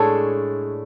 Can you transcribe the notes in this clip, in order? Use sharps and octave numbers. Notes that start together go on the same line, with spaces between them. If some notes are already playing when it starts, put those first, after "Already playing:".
Already playing: A2 G#3 D4 A4 C#5